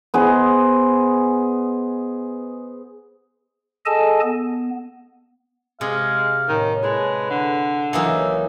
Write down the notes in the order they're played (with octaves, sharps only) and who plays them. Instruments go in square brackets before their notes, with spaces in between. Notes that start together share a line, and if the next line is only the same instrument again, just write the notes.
[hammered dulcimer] B3 G#4 C5 D#5
[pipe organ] G#4 A4 D#5 G#5 A5
B3
[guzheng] C3 [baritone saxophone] G#3 [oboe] F5 [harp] D#6
[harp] A2 A#3 C#4 [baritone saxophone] D#3
[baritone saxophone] G#3 [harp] E4 G#4 A4 [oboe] B4
[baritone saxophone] D3
[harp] C#2 F#3 E4 [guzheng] E3 A#3 D#4 [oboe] E5